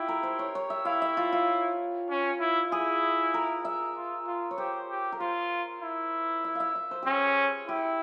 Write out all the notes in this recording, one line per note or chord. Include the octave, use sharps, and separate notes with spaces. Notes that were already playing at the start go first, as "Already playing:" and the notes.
Already playing: E4 F4 G4
A#4
C5
C#5
C#5
E5
E4 F5
E5
F4
F4
C#4
E4
E4 G#4
A#4
E5
F4
F4
C#5
G4 C5
G4
A#4
F4 C5
E4
E5
E5 F5
E5
C5
C#4 G4 G#4
E4 G4